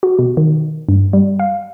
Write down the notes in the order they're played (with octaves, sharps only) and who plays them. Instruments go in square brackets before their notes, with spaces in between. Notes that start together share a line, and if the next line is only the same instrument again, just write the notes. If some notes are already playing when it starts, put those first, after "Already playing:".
[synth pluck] F#4
B2
D#3
G2
G3
F5